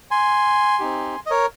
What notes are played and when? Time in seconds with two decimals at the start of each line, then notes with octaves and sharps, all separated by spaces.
0.11 G#5 C6
0.79 C4 D#4 G4
1.26 D#5
1.30 A#4 C#5